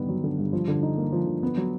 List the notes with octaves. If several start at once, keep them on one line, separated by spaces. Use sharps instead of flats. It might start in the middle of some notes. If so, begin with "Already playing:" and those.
Already playing: G2 D3 D#3 B3
F#3
D3
G2
F3
D3
D#4
A#3
F3
D3
B3
F#3